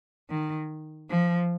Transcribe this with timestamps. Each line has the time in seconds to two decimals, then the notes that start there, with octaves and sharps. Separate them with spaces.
0.30 D#3
1.10 F3